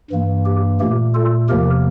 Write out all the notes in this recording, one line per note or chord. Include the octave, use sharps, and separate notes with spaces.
G2 E3 A#3
G4
A#2 A3 G4
F4 A4
E2 C3 F3 A#3 G4 A#4